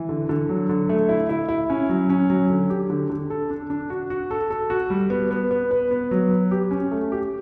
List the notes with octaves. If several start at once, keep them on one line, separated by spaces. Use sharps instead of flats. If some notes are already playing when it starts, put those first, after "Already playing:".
Already playing: E3
D3
D3
F#3
D3
A3
E4
E4
E4
C#4
F#3
C#4
F#3
D3
G4
D3
D3
A4
D4
D4
F#4
F#4
A4
A4
F#4
G3
B3
B3
B3
B4
B3
F#3
B4
G4
C#4
A3
G4